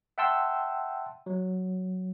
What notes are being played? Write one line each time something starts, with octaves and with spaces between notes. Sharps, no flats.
E5 F#5 G5 A5 C6 E6
F#3